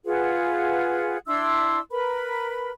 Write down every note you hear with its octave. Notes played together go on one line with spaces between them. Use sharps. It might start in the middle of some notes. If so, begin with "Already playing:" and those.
F4 G#4 B4 F#5
D4 E4 C6 E6
A#4 B4 B5